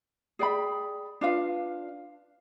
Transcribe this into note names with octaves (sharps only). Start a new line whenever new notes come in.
G#4 D5 G5 B5
D4 F4 B4 F5